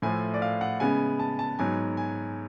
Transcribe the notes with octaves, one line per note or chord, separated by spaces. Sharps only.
A2 F3 A3 G#5
D5
F5
F#5
C#3 G#3 B3 G#5
A5
A5
G#2 F#3 B3 G#5
G#5